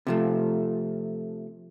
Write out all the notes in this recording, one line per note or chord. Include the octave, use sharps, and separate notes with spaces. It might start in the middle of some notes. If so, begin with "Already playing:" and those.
C3 F3 A3